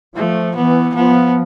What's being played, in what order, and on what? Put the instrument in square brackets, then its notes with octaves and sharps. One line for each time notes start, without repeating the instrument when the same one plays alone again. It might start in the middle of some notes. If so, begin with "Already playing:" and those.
[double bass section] F3 [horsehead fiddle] A3
[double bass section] E3 [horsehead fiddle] B3
[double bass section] F3 [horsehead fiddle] B3